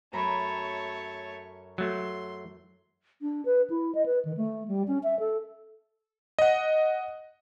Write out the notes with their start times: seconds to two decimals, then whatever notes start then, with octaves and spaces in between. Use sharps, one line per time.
0.13 F#2 A3 C#5 A#5 B5
1.78 F#3 A3 C6
3.22 D4
3.45 B4
3.70 E4
3.95 D#5
4.06 B4
4.25 D#3
4.37 A3
4.68 G3
4.87 C#4
5.03 E5
5.19 A4
6.39 D#5 F#5